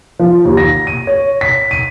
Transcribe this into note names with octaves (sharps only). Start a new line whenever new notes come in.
F3
D#2
A#6
D#7
C#5
B6
D#7